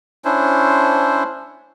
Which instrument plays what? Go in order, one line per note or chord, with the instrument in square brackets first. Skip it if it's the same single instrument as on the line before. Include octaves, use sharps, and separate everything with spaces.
[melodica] C#4 D4 E4 C5